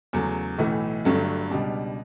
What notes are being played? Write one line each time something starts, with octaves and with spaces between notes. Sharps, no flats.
E2 C#3 F#3 A3
B1 A2 E3 A3
G1 G2 F#3 A3
C#2 B2 G3 D4